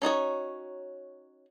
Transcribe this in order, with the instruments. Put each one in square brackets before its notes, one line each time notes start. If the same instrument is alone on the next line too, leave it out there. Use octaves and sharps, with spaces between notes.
[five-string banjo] C#4 D#4 F#4 C#5